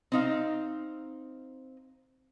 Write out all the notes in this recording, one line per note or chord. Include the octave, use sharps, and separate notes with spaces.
C4 D#4 F5